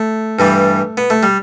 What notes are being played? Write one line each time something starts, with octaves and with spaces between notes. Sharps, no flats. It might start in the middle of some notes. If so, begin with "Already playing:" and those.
Already playing: A3
G2 E3 G3
B3
A3
G3